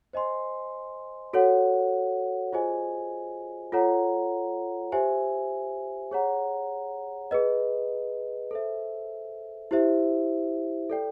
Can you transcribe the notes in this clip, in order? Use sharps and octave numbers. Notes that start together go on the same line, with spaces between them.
C5 D#5 G#5 C6
F#4 A4 C#5 F#5
F4 G#4 C5 D#5 G#5
F4 A4 C#5 F#5 A#5
G4 C5 E5 G#5
G#4 C#5 F#5 A#5
G#4 B4 D#5
A4 C5 E5
E4 G4 C5 E5
A4 D5 G5